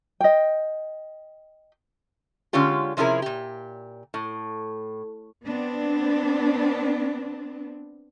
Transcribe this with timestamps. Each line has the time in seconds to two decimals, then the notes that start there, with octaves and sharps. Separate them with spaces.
0.20 D#5 G5
2.53 D3 G#3 C#4 F4 G4
2.97 C3 F3 C#4 E4 G#4 A#4
3.22 A#2 G4
4.14 A2
5.46 B3 C4 D4